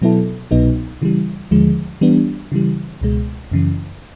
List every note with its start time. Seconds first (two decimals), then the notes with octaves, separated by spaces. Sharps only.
0.02 B2 F#3 B3 E4 A4
0.51 C2 B2 F#3 B3 D#4
1.02 C#3 E3 G3
1.51 D#2 D3 F3 G#3
2.01 E3 G3 B3 D4
2.52 C#3 E3 G3
3.01 C#2 B2 G#3
3.52 F#2 C#3 E3